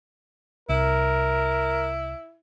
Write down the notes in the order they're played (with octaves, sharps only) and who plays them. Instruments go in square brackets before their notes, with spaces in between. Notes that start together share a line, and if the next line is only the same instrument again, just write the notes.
[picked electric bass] C2 [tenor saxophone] E4 [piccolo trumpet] A#4